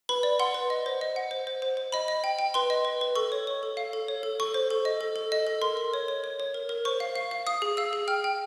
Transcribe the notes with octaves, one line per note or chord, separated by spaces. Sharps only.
B4 B5
D5
F#5 C6
B4
D#5
C5
D#5
F#5
C5
C5
C5
C5
D#5 B5
D#5
G5
G5
B4 C6
D#5
B4
B4
A4 C#6
C#5
C#5
A4
F5
A4
C#5
A4
A4 C#6
C5
A4
D#5
A4
A4
D#5
A4
A#4 C6
A#4
C#5
C#5
C#5
C#5
A#4
A#4
C5 C#6
F5
F5
F5
F5 D#6
G#4
F5 E6
G#4
G5 F6
G5